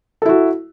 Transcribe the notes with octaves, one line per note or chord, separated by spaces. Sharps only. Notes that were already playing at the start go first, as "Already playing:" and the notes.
E4 F#4 A4